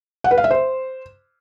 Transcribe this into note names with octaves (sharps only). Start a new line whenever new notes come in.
F#5
B4
F5
E5
C5